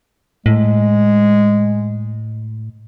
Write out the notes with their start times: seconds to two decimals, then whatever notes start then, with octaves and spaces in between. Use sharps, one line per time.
0.46 A2 G#3